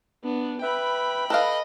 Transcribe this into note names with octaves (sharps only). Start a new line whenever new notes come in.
B3 D4
B4 E5 G5 B5
A4 B4 D#5 F5